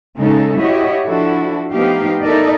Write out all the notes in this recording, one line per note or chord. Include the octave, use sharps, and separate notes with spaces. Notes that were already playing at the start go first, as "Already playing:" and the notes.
C#3 G#3 C#4 D#4 A4
E4 F#4 G4 C#5 D#5
F3 D4 E4 F#4 A4
F3 A3 B3 D#4 G4 F5
D#4 E4 A4 A#4 D5 D#5